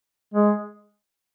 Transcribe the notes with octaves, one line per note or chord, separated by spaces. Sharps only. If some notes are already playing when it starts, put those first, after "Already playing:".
G#3